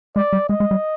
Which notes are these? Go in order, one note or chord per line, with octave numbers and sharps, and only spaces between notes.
G#3 D5
G3
G#3 D#5
G#3
G3